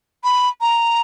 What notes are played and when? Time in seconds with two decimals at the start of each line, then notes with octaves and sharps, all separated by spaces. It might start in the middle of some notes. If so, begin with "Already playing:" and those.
0.24 B5
0.61 A#5